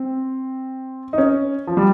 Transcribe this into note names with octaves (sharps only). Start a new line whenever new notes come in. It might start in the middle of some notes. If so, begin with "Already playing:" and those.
Already playing: C4
D#4
C#4
F3
G3